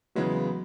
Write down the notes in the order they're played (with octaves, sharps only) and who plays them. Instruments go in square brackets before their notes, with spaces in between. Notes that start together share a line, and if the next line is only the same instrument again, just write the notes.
[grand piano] E2 C#3 E3 G#3 B3 [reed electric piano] F#3